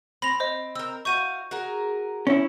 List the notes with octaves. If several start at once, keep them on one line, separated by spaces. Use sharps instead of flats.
C4 B5 A#6 F7
C5 D#5
C4 A#4 E6
E4 F#4 F5 C#6 G6 D#7
F#4 G#4 A#4
C#4 E4